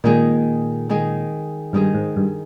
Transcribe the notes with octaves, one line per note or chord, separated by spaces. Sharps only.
A#2 D#3 G#3 D#4 G#4
D#3 G#3 D#4 G#4
G2 D#3 G#3 D#4 G#4
G#2
G2